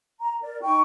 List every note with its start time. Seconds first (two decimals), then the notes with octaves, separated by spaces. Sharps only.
0.20 A#5
0.42 A#4 D5
0.62 D#4 G5 C#6